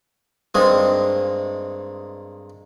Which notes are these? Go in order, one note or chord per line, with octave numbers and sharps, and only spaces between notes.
G2 G#3 A#3 C4 D#4 D#6